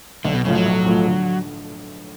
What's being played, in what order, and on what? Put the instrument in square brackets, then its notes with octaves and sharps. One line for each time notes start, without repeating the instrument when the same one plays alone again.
[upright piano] B1 [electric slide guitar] D3
[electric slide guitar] B2
[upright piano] A2 F3 A3 F4 [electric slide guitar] C#3
[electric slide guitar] F#3
[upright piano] B1
A2 F3 A3 F4
D3